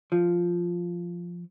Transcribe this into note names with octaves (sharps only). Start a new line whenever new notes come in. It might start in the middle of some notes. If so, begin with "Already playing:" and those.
F3